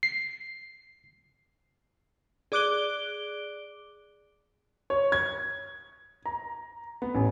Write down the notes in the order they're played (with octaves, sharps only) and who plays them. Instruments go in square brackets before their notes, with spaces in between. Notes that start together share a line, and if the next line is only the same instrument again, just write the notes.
[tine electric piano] C7
[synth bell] G#4 D5 D6 F#6 D7 G7
[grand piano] C#5
G#6
A#5
B3
A1